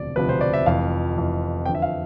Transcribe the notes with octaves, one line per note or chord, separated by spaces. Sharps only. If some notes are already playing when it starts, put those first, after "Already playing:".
Already playing: E1 D2 C3 F3 D5
E1 D2 C3 F3 B4
C5
D5
E5
F1 F2 E3 F5
F1 F2 E3
E2 D3 F3 G5
E5
F5